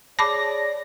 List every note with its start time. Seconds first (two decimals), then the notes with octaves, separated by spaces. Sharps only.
0.19 G#4 C#5 D5 A5 B5 D6 A#6